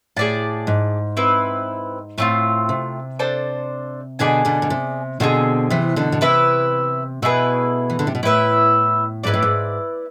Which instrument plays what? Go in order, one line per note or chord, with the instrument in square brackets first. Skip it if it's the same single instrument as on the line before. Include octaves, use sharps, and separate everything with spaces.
[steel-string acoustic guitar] A2 [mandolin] G#4 D5 A5
[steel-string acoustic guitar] G#2
[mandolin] C4 E4 B4
[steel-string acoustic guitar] A2 [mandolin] A3 C4 F4
[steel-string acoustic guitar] C3
[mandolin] D4 A4 C5
[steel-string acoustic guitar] B2 D3 [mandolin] G#4 D5 G#5
[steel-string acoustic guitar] B2 D3
B2
C3
[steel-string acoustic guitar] B2 D3 [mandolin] C4 F4 G#4
[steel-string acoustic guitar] C3 E3
B2 D3
B2
[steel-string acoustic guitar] C3 [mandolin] E4 B4 E5
[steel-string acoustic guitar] B2 [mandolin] A3 E4 G#4 B4
[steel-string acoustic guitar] E3
D3
C3
B2
[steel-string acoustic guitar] A2 [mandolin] E4 B4 E5
[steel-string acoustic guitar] G#2 [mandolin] E4 B4 D5
[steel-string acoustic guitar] A2
G#2